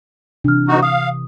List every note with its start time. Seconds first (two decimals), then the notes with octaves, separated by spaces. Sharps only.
0.44 C3 E3 D4 F6
0.68 D2 D#4 F#4
0.83 F5 D#6